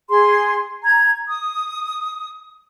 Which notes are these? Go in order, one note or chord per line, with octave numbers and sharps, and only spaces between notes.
G#4 C6
A#5 G#6
D#6